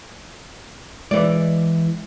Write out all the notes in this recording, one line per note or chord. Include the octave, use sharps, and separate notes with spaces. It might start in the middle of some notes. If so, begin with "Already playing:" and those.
E3 G#3 D5